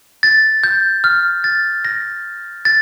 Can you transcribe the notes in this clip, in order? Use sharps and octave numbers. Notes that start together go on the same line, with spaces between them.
A6
G6
F6
A6
A#6
A6